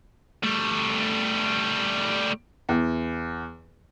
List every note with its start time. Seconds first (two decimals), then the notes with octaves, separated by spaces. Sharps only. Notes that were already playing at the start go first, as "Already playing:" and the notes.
0.43 G3 A3
2.69 E2